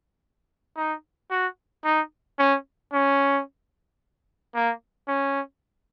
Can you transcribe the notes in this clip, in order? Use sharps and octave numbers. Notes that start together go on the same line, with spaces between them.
D#4
F#4
D#4
C#4
C#4
A#3
C#4